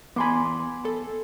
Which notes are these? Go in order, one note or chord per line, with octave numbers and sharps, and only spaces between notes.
E2 B3 G#5 B5 C6 D6
A4